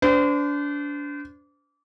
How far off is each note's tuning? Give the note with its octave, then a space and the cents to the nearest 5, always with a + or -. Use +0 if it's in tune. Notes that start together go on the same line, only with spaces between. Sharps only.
D4 -30 C5 -40